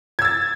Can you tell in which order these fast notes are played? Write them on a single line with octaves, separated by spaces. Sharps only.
G#6 E6 A6